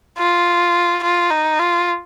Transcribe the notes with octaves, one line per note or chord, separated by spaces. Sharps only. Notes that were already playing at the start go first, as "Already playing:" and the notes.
F4
F4
D#4
F4